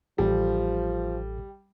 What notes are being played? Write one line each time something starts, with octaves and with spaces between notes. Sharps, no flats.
A1 F3 G3 A4